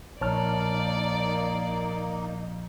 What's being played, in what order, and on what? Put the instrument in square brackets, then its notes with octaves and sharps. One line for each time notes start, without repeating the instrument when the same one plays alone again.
[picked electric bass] A#1 [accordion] A#3 D#4 [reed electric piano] C#5 A5 F6 [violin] D5